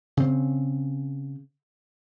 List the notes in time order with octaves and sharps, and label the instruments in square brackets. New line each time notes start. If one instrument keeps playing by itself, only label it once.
[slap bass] C#3 C4